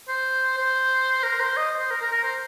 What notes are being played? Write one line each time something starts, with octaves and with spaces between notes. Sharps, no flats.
C5
C5
A#4
C5
D#5
C5
A#4
A#4
A#4
C5